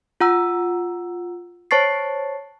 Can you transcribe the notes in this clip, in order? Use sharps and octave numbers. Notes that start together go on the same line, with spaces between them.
F4 F#5 A#5 E6
C5 C#5 A5 C#6 A6 C7